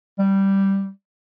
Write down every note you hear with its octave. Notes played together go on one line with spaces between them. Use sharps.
G3